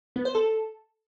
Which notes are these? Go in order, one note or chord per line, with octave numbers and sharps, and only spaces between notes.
B3
C5
A4